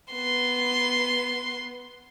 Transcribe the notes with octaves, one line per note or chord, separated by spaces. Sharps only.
B3 C6